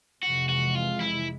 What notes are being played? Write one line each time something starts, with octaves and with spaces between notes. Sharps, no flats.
F2 C3 E3 G#3 F#4
F#4
F4
E4